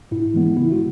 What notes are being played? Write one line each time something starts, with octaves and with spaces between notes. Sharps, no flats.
G#2 E4
E3 G#3 B3
C#3 E4
F#4